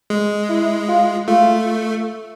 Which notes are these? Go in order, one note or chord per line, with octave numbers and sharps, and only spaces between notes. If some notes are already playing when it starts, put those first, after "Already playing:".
G#3
E4
F4
A3 F4